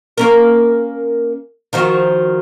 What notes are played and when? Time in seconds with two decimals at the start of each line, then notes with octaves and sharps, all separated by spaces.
0.18 A#3 C#4 A#4
1.73 D#3 F3 F#4